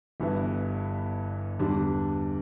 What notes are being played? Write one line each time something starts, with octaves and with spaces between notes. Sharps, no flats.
G1 G2 E3 B3 E4
E2 D3 G3 D4